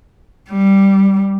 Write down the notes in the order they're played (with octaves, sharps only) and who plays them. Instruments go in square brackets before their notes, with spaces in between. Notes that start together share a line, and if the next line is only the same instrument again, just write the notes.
[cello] G3